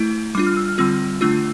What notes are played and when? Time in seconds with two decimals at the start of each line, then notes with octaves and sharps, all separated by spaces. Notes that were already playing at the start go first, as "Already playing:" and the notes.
Already playing: A3 E4
0.35 G3 D4 F4 D6
0.47 F6
0.57 E6
0.68 F6
0.78 D3 G3 C4 F4 E6
1.21 D3 A3 D4 F4 E6